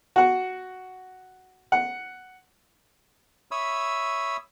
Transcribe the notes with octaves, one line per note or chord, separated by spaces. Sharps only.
F#4 F#5
F#5
C#5 E5 B5 D#6 E6